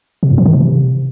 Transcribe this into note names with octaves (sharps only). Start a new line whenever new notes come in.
C3
G2
F3
D#3
C3